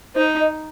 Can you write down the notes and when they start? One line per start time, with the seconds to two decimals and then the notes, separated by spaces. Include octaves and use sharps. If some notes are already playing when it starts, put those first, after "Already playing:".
0.15 D#4 C5
0.40 D#5